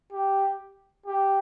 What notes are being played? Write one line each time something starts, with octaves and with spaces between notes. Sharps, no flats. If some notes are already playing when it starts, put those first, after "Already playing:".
G4
G4